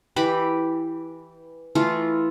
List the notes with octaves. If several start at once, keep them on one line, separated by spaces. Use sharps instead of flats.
E3 G4 B4 B5
E3 A3 F4